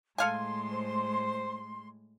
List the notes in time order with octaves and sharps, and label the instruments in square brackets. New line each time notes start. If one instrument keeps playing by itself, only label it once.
[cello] A2 G#3 [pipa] A4 F5 G#5 [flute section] C6
[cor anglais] C5